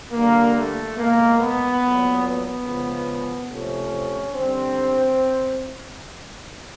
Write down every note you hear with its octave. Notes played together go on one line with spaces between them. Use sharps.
D3 G3 A#3
A3
B2 G#3 A#3
B3
A#2 F#3 A3
B3
C#3 F3 G#3
C3 F3 A3 C#4
D3 G3 C4